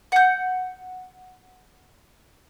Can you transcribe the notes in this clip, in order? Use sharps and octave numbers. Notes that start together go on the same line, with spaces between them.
F#5 G6